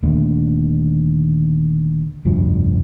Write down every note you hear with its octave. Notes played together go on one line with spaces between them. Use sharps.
D#1 D#2 D3 A3
F1 D2 G2 F3